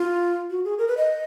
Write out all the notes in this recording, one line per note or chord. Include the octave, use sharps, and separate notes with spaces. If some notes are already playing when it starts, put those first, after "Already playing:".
Already playing: F4
F#4
G#4
A#4
B4
D#5